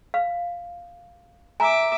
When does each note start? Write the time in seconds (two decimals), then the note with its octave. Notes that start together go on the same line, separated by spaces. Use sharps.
0.14 F5
1.60 E5 G#5 A#5 D6